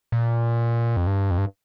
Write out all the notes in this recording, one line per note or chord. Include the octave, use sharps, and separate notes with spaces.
A#2
F2
G2
F2
G2